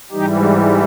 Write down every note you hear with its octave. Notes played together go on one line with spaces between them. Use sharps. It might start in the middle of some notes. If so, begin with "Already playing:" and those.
G#2 E3 G3 D#4 G4